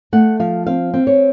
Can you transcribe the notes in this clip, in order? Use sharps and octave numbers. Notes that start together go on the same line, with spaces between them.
A3 F#5
F3 F5
C4 F5
C4
C#5